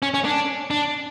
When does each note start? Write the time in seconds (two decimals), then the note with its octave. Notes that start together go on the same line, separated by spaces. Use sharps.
0.02 C#4
0.14 C#4
0.25 D4
0.70 D4